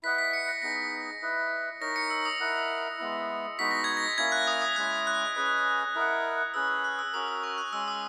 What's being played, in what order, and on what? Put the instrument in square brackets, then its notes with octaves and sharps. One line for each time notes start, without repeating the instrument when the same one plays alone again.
[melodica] E4 B4 D#5 F#5 [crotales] B6
[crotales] B6
C#7
A#6
[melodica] B3 D#4 G#4 [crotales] A#6
[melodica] E4 B4 D#5
[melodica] D#4 A#4 C#5 [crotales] A#6
[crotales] C#7
E6
D#6
[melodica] E4 A#4 D#5 F#5
G#3 B3 E4
[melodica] G#3 B3 D#4 F#4 [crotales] B6
[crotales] A#6
G#6
A#6
[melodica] A#3 C#4 E4 [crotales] G#6
[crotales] F#6
D#6
D#6
[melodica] G#3 C#4 E4 [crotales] F#6
[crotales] F#6
[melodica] C#4 G#4 B4 D#5
E4 A#4 D#5 F#5
[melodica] C#4 G#4 B4 [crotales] E6
[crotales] E6
F#6
E6
[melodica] C#4 F#4 A#4 [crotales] D#6
[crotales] D#6
C#6
F#6
[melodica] G#3 C#4 G#4 [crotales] E6
[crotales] D#6